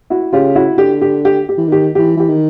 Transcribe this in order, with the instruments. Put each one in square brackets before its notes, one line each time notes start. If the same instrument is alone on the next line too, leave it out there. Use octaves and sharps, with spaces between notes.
[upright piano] E4 F#4
[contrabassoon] C#3 [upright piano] F4 G4
[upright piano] E4 F#4
[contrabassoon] D3 [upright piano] G4
[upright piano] G4
G4
G4
[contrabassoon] E3
[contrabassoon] D#3 [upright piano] G4
[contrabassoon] E3 [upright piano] G4
[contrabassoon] E3 [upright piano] G4
[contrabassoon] D#3